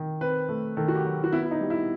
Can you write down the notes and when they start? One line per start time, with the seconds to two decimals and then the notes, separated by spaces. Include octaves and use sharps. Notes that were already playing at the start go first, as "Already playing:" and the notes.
Already playing: D#3
0.21 C4 B4
0.49 A3
0.77 D#3 A4
0.88 F#4
0.95 G4
1.05 F#3
1.24 F#4
1.32 B3 E4
1.43 E4
1.51 D#4
1.61 G3
1.70 E4